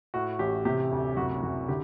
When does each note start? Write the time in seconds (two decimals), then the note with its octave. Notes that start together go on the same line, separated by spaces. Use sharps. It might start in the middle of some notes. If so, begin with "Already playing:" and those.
0.14 A2 F#4
0.39 A1 G4
0.65 C3 G4
0.91 D2
1.17 F#1 F#4
1.43 F#1 F#4
1.68 D3 G4